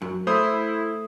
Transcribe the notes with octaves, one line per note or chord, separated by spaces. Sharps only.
F#2
A3 E4 C5 D#6